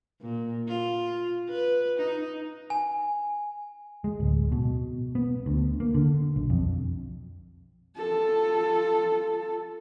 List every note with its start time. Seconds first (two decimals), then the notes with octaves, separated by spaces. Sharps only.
0.21 A#2
0.68 F4
1.49 B4
1.98 D#4
2.70 G#5
4.04 G#3
4.20 D1
4.52 B2
5.15 B3
5.46 D2
5.80 A#3
5.94 D3
6.36 B1
6.50 F2
7.97 F4 A4